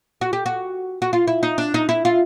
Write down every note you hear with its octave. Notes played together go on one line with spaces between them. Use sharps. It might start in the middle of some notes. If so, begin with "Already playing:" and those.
F#4
G4
F#4
F#4
F4
E4
D#4
D4
D#4
E4
F4